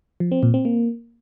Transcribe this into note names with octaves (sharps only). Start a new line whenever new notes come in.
F3
C4
A#2
C4
A#3